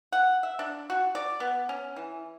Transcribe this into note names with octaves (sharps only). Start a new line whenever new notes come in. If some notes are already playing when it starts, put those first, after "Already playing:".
F#5
E5
D4
F#4
D5
B3
C#4
E3